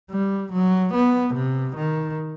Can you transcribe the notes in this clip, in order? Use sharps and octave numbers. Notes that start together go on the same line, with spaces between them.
G3
F#3
B3
C3
D#3